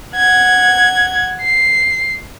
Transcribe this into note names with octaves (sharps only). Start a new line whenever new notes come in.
F#5 G#6
C7